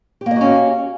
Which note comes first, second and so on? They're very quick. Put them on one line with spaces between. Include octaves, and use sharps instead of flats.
G4 A#3 D#5 F#4 C#4